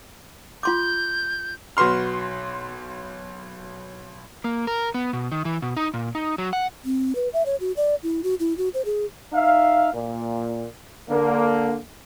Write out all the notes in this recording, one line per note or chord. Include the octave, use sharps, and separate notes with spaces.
F4 C6 D6 G6
B1 F#4 B4 C6 F6
A#3
A#4
B3
B2
D#3
E3
B2
D#4
A#2
D#4
F#3
F#5
C4
B4
E5
C#5
F#4
D5
E4
F#4
E4
F#4
C5
G#4
D#4 E5 F5
A#2
D3 A#3